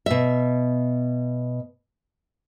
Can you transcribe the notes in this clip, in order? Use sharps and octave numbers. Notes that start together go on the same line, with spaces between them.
B2 E5